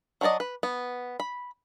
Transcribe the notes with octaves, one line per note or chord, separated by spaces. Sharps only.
F#3 D4 F#4 D5 D#5
B4
B3
B5